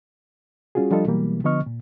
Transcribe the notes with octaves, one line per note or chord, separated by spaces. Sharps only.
G3 C#4 F4 F#4 G#4
F3 G3 D4 F4 A4 D#5
B2 E3 F#3 G3 A#3
D3 F3 B3 D#5 C#6 F6
A#2